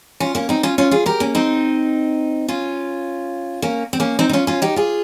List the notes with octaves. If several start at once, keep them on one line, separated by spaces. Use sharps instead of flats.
C#4 F4
A#3 C#4
C4 D#4
C#4 F4
C#4 F4
F4 G#4
G4 A#4
A#3 C#4
C4 D#4
C#4 F4
A#3 C#4
C4
A#3 C#4
C4 D#4
D#4
C#4 F4
C#4 F4
D#4 G4
F4 G#4